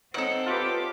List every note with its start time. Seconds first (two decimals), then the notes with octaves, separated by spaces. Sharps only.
0.14 C4 D#4 A4 C#5 F#5
0.46 F4 G4 B4 D6